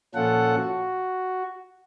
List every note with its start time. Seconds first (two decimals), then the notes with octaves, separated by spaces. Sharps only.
0.15 A#2 F3 C#4 F4 A4 F#5
0.55 F#4